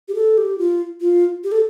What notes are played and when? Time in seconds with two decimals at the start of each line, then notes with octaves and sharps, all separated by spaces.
0.08 G4
0.15 A4
0.38 G4
0.58 F4
1.01 F4
1.44 G4
1.52 A4